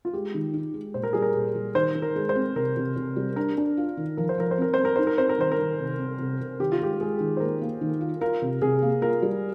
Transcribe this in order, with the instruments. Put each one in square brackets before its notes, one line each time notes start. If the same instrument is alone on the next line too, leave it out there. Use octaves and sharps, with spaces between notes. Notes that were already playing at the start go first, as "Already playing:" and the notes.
[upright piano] F4
[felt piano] G#3 [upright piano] G4
[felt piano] D#3
D#4
G#3
[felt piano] A#2 [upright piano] C5
[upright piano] A#4
[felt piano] G3 [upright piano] G#4
[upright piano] A#4
[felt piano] A#2
G3
[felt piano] D#3 [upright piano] C5
[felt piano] D#3
[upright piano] A#4
[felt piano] G#3
[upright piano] C5
[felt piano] C4
[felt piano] C3 [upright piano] A#4
[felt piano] C3
C3
G3
[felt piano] D4 [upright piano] A#4
[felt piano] D4
F4
D#3
[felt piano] F3 [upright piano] A#4
[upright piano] C5
[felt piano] F3 [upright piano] A#4
[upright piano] C5
[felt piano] C4 [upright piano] A#4
[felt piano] C4 [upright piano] C5
[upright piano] A#4
[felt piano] D#4 [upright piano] C5
[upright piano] A#4
[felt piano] C4 [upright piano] C5
[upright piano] A#4
[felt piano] D#3 [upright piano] C5
[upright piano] A#4
[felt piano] D#3
C3
C4
C3
C3
[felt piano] D#3 [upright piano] G4
[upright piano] F4
[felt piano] G#3 [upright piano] G4
[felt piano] G#3 [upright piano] G#4
[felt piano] D#3
[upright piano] C5
[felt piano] A#3 [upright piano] A#4
[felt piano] A#3
D#3
F4
[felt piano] F4 [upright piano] A#4
[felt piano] C3
[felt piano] C3 [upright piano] G#4
[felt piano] A#3
[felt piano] F4 [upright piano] A#4
[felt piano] G3